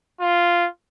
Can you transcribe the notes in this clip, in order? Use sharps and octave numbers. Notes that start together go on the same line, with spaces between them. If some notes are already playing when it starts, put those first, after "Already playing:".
F4